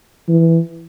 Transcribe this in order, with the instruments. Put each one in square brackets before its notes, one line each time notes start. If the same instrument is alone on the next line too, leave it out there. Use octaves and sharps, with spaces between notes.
[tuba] E3